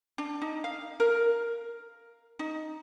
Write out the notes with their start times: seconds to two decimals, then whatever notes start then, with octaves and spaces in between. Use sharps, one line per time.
0.18 D4
0.42 D#4
0.64 F5
1.00 A#4
2.39 D#4